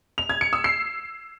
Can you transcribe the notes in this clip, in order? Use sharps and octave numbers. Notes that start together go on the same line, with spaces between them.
F7
G#6
C#7
E6
C7